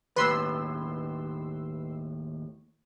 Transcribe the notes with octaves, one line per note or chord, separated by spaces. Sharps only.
D#2 A2 B4 C6 E6